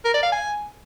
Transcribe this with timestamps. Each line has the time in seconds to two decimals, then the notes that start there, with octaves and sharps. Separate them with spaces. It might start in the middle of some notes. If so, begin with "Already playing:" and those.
0.05 A#4
0.14 D5
0.23 F5
0.32 G#5